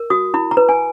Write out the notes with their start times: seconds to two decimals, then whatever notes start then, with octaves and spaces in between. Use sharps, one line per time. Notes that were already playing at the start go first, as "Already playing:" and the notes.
Already playing: A#4
0.10 F#4 D#6
0.34 E4 B5
0.51 A#5
0.57 B4
0.69 G#5